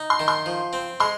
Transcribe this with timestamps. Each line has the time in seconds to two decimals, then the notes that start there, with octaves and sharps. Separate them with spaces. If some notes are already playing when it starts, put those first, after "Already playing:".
Already playing: D#4
0.10 C6
0.19 D#3
0.28 C6
0.46 F3
0.73 C4
1.00 G#3 C6